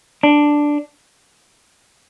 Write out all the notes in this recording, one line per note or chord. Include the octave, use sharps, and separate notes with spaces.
D4